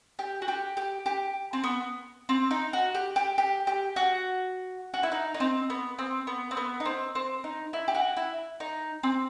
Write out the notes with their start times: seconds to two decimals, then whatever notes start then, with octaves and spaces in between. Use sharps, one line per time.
0.19 G4
0.42 F#4
0.48 G4
0.77 G4
1.06 G4
1.53 C4
1.64 B3
2.29 C4
2.51 D#4
2.73 F#4
2.95 G4
3.16 G4
3.38 G4
3.67 G4
3.96 F#4
4.94 F#4
5.03 E4
5.12 D#4
5.34 D#4
5.40 C4
5.70 B3
5.98 C4
6.27 B3
6.51 C4
6.57 B3
6.80 D#4
6.85 C4
7.15 C4
7.44 D#4
7.73 E4
7.88 G4
7.95 F#4
8.17 E4
8.60 D#4
9.03 C4